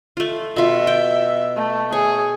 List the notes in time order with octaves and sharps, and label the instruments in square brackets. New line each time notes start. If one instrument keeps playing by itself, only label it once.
[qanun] A3 F4
[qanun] B2 F4 [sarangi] E5
[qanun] G5
[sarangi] A3
[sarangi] G#4 [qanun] C#5